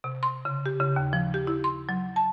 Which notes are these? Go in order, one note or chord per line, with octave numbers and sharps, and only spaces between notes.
C3
C6
C#3
G4
C#3
D#2
F3
G4
E4
C6
F#3
A5